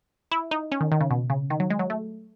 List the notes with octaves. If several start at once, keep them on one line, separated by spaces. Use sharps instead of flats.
E4
D#4
C#4
D#3
D#3
C#3
B2
C#3
D#3
F#3
G#3
F#3
A3